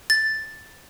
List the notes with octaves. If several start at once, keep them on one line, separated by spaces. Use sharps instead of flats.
A6